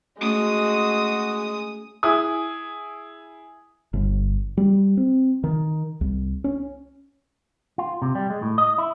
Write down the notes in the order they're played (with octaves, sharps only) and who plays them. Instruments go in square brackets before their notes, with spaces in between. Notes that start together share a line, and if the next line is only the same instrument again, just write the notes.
[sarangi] G#3 [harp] A3 C#4 [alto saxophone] F#4 [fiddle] D#6
[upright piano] E4 G#4 D#6
[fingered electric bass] G1
G3
C4
D#3
C2
C#4
[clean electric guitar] F4
C3
G3
G#3
A2
D#5
E4